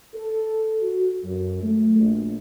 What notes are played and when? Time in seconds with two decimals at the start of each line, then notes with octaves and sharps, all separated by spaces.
0.15 A4
0.81 F#4
1.22 F#2
1.63 A3
1.99 A#1